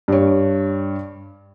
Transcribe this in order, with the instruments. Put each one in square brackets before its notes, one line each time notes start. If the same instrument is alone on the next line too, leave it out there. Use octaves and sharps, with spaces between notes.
[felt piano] G2 C#5